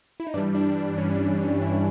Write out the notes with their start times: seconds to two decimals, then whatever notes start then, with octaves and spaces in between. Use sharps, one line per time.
0.20 E4
0.27 D#4
0.34 G2 E3 G3 D4
0.55 D4
0.77 D4
0.98 C#4
1.15 D4
1.19 C#4
1.41 C#4
1.62 E4